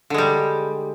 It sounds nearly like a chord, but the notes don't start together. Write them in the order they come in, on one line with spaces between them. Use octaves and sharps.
D3 G#3 G3